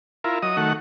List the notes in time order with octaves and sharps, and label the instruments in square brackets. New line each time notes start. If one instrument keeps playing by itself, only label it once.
[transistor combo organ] E4 F4 A#4
F#3 D#5 D#6
D#3 A3 F#4 F#5